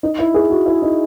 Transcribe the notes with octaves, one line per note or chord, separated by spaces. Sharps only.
D#4
E4
G#4
F#4
E4
D#4